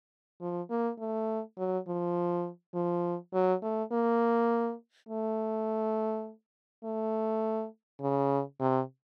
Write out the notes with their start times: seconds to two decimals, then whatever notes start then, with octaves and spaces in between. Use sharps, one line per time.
0.41 F3
0.70 A#3
1.00 A3
1.58 F#3
1.88 F3
2.75 F3
3.34 F#3
3.63 A3
3.92 A#3
5.09 A3
6.84 A3
8.01 C#3
8.60 C3